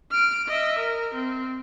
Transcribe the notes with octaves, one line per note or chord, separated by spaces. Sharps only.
F6 D7
D#5 E5
A#4
C4